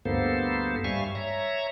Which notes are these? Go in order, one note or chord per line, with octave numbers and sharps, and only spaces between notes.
D2 G2 A#3 B3 A4 C5
G2 G3 E5 F5 G#5 C#6
C#5 E5 A#5